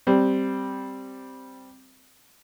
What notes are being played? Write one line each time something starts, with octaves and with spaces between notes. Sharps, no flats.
G3 C4